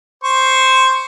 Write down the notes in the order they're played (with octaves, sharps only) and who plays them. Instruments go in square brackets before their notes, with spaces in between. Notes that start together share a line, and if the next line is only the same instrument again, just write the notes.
[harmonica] C5 C#6